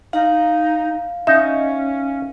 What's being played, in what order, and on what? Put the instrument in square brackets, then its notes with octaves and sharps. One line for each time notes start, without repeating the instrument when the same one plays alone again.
[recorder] D#4 [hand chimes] F5
[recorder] C#4 [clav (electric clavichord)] D#4 [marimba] E5